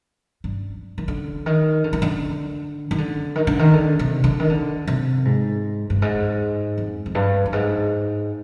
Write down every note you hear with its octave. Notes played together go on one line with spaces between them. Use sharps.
G2
D#3
D3
D#3
D3
D#3
D3
D#3
D3
D#3
D3
D#3
D3
C3
D3
D#3
D3
C3
G#2
G2
G#2
F2
F2
G2
G2
G#2